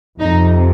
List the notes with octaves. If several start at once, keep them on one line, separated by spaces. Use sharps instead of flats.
F2 C3 F3 D#4